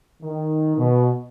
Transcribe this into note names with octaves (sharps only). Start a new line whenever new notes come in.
D#3
B2